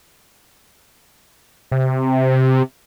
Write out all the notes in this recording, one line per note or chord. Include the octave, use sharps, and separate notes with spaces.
C3